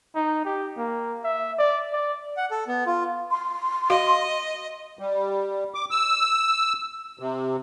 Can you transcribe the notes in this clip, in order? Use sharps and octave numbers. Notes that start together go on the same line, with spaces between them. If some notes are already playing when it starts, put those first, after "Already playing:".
D#4
G4
A#3
E5
D5
D5
F#5
A4
B3
F4
C6
F#4 D#5 F5
G3
D6
E6
C3